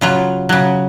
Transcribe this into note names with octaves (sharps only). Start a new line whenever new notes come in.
C#3 F#3 F4
C#3 F#3